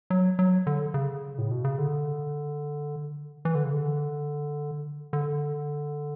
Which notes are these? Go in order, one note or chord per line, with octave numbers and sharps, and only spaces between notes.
F#3
F#3
D3
C#3
A2
B2
C#3
D3
E3
D3
C#3
D3
D3